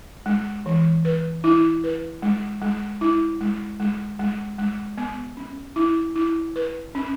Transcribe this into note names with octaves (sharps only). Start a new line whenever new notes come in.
G#3
E3
B4
E4
B4
G#3
G#3
E4
G#3
G#3
G#3
G#3
B3
C#4
E4
E4
B4
C#4